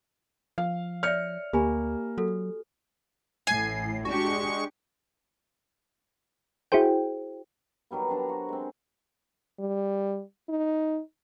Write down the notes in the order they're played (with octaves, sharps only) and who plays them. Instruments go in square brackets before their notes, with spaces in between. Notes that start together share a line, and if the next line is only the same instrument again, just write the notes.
[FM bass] F3 [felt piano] F5
[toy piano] C#5 D5 E5 [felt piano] F6 C#7
[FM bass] D2 [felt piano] A#3 [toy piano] G4 G#5 B5
[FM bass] F#3 [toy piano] F#4 A4
[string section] A1 A2 [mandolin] G#5 [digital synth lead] C7
[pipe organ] G#3 C#6 [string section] D4 G4 [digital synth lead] F#4
[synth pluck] E4 F#4 G#4 C5 G5
[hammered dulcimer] D#3 F#3 G3 B3
F#3 D4 C5 A#5
F#4
G#3 C4
[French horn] G3
D#4